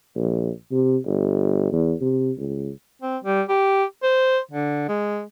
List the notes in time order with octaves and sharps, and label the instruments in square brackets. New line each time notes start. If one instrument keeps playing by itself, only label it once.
[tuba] A#1
C3
G1
E2
C3
C#2
[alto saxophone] C4
G3
G4
C5
D3
G#3